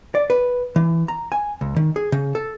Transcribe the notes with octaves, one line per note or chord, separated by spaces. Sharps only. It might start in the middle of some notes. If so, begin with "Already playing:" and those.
D5
B4
E3
A#5
G#5
C#2
D#3
G#4
C#3
A4